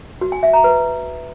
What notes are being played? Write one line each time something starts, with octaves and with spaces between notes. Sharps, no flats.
F#4
G#5
E5
A#5
B4